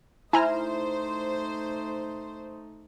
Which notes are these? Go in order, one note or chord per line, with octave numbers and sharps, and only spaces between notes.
A3 D#4 E4 C5 G#5 A#5 F6